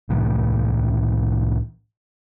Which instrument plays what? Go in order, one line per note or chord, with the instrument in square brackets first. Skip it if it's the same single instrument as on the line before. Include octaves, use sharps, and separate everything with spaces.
[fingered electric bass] C2 A2 C3 E3